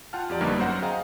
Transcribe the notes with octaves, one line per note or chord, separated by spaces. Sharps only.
F4 F#5 G5 A5 F6
F2 G4 D5 A#5
G1 G2 A#3 D#4 B4 F6
F#2 F#3 C5 F#5
G#4 D#5 F5 G5 A#5